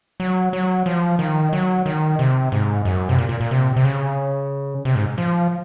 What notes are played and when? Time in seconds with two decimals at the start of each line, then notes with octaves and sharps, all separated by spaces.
0.20 F#3
0.53 F#3
0.86 F3
1.19 D#3
1.53 F#3
1.86 D#3
2.19 C3
2.52 G#2
2.85 F#2
3.09 C3
3.19 A#2
3.29 A#2
3.41 A#2
3.51 C3
3.76 C3
3.85 C#3
4.85 C3
4.95 G#2
5.18 F3